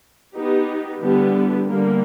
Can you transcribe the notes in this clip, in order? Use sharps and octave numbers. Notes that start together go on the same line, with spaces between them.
B3 D#4 G4
D3 G3 B3 E4 G4
D3 G3 A#3